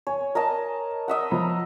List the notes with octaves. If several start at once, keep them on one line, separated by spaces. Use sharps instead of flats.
C#5 G#5
A#4 D#5 A5
D#5 E5 F#5
F3 A#5 B5